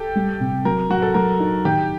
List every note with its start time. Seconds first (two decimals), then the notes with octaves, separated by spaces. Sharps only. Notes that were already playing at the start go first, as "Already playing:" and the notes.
Already playing: G4 A4
0.15 G3
0.40 C3
0.65 F#3 A#4
0.90 F#3 F#4
1.02 A4
1.14 F#3 A#4
1.40 D#4
1.65 D#3 G4